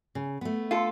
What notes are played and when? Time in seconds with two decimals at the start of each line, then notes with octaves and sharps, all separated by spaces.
0.15 C#3
0.41 A3 B3
0.71 F4 A4